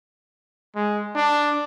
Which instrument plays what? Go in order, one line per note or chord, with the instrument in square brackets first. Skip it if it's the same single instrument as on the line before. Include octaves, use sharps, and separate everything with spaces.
[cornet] G#3
D4